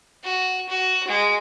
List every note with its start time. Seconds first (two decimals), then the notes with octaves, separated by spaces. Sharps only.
0.23 F#4
0.69 F#4
1.08 G#3